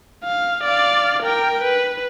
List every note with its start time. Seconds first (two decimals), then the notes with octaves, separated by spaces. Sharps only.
0.24 F5
0.64 D5 F5
1.23 A#4 G5
1.62 B4